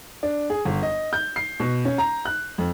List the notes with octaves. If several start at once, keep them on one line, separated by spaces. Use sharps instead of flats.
D4
G#4
G1
D#5
G6
C7
B2
C#4
A#5
F#6
F2